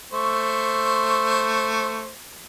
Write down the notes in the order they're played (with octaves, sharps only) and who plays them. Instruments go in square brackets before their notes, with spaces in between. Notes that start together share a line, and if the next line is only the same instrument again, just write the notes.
[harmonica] A3 C5 C#6